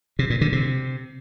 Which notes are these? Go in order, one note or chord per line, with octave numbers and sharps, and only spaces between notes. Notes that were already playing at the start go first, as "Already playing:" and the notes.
C3
A#2
D3
C3